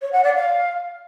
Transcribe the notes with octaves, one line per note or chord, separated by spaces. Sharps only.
C#5
F#5
D5
F5